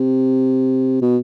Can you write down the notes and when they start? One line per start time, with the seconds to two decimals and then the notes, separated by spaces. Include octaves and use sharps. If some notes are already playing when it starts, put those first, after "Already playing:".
Already playing: C3
1.02 B2